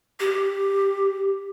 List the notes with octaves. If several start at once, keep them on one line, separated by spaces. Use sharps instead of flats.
G4